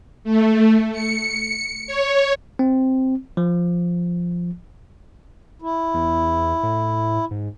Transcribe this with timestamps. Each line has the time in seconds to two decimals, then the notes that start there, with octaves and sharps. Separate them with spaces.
0.24 A3
0.92 C#7
1.87 C#5
2.59 C4
3.37 F3
5.62 E4
5.94 E2
6.63 A2
7.31 G#2